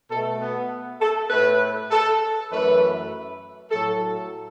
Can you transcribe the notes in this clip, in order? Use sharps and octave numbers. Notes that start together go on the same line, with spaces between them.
B2 A4
A3
B3
A4
A2 A3 B4
A4
F#2 E3 A3 B4
A2 F#3 A3 A4